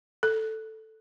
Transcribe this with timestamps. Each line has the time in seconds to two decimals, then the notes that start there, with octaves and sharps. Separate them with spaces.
0.23 A4